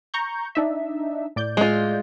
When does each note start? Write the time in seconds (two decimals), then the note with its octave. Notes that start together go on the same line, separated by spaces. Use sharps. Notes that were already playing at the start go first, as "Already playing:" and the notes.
0.14 A#5 C#6 G6
0.55 D4 D#4 E5
1.36 A2 D5 G6
1.57 G#3 F4